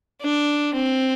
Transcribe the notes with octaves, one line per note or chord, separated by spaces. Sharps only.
D4
C4